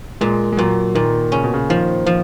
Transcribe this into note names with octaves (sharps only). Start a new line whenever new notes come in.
A#2 G#3
G#3
A#2 F#3
A#2 D#3
C#3 C#4
B2
C#3
D#3 F3
F3